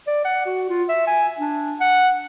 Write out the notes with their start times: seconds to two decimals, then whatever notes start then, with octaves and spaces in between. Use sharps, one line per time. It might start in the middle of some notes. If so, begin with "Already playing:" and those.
0.07 D5
0.25 F#5
0.46 F#4
0.70 F4
0.89 E5
1.08 G#5
1.39 D4
1.80 F#5